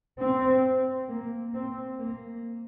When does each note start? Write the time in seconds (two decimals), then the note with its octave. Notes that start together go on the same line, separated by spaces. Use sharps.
0.19 C4
1.09 A#3
1.54 C4
1.99 A#3